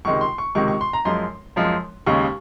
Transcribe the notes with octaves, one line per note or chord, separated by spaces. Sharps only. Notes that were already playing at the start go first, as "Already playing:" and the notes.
C#2 C3 D#3 G#3 C#6
C6
C#6
C#2 C3 D#3 G#3 C#6
C#6
C6
A#5
F#2 F3 G#3 C6
F#2 F3 G#3
D#2 C#3 G#3 C#6